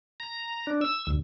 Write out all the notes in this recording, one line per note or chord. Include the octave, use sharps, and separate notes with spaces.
A#5
D4
E6
D2